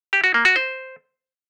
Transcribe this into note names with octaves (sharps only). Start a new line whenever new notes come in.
G4
F#4
A#3
F#4
C5